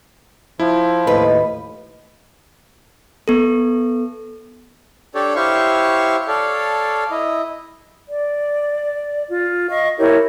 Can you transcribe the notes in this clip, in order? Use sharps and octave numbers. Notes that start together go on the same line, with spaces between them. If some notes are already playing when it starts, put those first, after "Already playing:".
F3 E4
D#2 A2 B4 D#5
B3 A4
D4 G4 A4 C#5 D5
E4 G4 C5 C#5 F5 C#6
A4 C#5 D5 F5
E4 D#5
D5
F4
D#5 F5 C#6
E4 G4 A#4 C#5